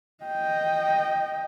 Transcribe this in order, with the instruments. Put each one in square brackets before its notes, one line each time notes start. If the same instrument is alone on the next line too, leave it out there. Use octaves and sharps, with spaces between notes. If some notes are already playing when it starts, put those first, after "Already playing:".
[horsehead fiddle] D#5 G5